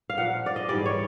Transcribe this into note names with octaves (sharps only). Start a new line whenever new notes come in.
F5
A#2 F3 F#5
D5
D#5
G#2 E3 G3 D5
C#5